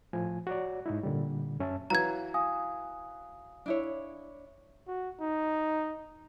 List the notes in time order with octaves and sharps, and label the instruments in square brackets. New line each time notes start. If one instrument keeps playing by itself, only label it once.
[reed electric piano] A2 F3 G#5
F#4 C#5 D5
G#2 D#4 E4
A#2 D3 G3
F#2 C#4 E5 A5
[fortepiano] E3 F#3 [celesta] F5 [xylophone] A#5 G#6
[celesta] F5 G#5 D#6
[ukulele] D4 E4 C#5
[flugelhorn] F#4
D#4